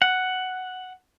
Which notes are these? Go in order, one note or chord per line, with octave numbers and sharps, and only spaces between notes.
F#5